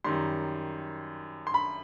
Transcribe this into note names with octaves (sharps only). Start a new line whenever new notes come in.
F#2 D#3 G3 C6
C6
B5